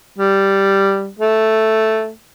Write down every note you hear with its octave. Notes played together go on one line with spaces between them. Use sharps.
G3
A3